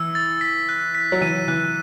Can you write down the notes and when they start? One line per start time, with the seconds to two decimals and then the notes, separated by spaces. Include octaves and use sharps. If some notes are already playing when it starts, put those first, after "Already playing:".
Already playing: E3 E6
0.15 A6
0.41 B6
0.69 F#6
0.95 B6
1.12 F#3
1.21 E3 D#7
1.48 E3 F#6